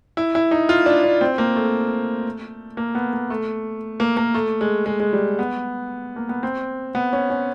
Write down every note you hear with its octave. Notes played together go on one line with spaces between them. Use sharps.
E4
E4
D#4
F4
D4
D4
C4
A#3
A3
A#3
B3
A#3
A3
A#3
A#3
A3
G#3
G#3
G#3
G3
B3
A#3
B3
C4
B3
C#4
C#4